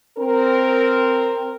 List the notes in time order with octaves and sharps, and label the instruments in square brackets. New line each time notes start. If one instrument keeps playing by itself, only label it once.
[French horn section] C4 A#4